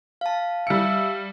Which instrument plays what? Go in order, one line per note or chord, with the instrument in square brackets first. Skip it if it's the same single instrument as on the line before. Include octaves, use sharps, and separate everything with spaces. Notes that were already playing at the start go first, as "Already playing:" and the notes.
[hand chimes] F5 A5
[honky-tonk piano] G3 C#7 [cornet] E5